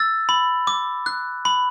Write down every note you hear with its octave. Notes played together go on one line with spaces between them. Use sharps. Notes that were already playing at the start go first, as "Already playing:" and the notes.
Already playing: E6 A6
B5
D6
F#6
B5